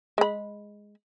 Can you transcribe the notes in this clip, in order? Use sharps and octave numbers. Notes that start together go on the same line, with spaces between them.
G#3 B5